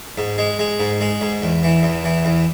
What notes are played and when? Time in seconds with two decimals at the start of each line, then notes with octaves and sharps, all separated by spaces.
0.18 G#2
0.38 G#3
0.59 G#3
0.80 G#2
1.01 G#3
1.21 G#2
1.42 E2
1.63 E3
1.83 E2
2.04 E3
2.25 E2